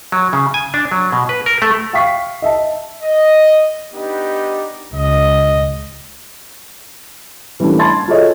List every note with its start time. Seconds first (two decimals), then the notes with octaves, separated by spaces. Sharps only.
0.12 F#3
0.33 C#3
0.54 G#5
0.74 D4
0.92 F#3
1.12 B2
1.29 B4
1.46 A#4
1.62 A3
1.93 E5 F5 G5 C#6 B6 C7
2.42 D#5 E5 A5
3.03 D#5
3.93 B3 D4 D#4 G4
4.94 C#2 D#5
7.60 E3 G3 A3 A#3 C#4 D4
7.79 A5 B5 C6 G#6 A6
8.08 F4 F#4 G#4 A4 C#5 D#5